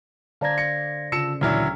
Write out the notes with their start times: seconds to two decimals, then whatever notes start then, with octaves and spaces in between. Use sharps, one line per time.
0.41 D3 C5 D5 F5 A5 A#5 G#6 A#6
0.58 A#6 C#7
1.12 C#3 F4 A5 E6 C#7 E7
1.41 D2 A#2 E3 F#3 E4 D5 F6